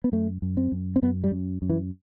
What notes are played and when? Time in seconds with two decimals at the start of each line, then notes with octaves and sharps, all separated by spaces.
0.04 B3
0.12 F#2 A3
0.42 F#2
0.57 C4
0.72 F#2
0.96 C4
1.02 F#2 B3
1.24 G3
1.31 F#2
1.62 F#2
1.70 E3